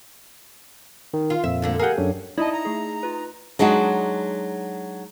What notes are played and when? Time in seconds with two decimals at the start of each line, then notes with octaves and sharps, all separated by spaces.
1.14 D#3
1.30 F4
1.44 F2 A#2 E5
1.62 D2 D3 A#3
1.79 G4 G#4 A#4 F#5
1.98 F#2 F#3 D4
2.38 D#4 E4 D5 D#5 A5
2.52 A#5
2.65 A3 G#4
3.03 F4 B4
3.59 F#3 G#3 D4 D#4 F#4